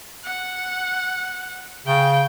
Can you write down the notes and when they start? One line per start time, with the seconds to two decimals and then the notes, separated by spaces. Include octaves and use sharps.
0.25 F#5
1.87 C#3 G5